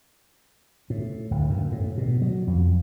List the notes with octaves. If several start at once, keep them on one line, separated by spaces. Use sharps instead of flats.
A2
D1
F#2
A2
B2
F#3
F2